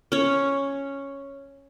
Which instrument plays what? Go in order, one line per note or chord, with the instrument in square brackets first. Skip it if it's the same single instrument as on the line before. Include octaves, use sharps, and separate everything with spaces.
[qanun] C#4 C#5